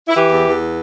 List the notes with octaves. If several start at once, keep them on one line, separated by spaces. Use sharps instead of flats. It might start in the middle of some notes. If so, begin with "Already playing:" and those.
E4
E3 G4
E2
E2